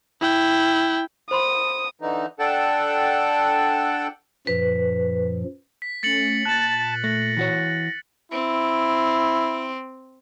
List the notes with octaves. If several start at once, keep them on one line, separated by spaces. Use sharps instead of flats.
E4 G5
C5 B5 C6 D#6
D3 E3 D#4
D4 A4 F#5 G5 A5
F#2 A#2 F3 B4
B6
A3 C#4 A6 C#7 F#7
A#2 A5 F#6 A6
A3 A#6
E3 F#4 C#5
C4 E4